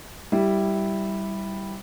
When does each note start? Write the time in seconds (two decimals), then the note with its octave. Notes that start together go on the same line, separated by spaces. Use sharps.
0.32 G3 E4